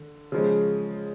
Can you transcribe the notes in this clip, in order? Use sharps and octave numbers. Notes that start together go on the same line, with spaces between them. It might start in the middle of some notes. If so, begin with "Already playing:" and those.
Already playing: D3
C#3 F3 G#3